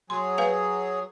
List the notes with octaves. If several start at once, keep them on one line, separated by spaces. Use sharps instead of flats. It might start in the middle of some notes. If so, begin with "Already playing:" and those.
F#3 G#4 C6
B4 F5 G#5